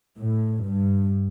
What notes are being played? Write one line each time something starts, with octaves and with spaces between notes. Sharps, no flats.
A2
G2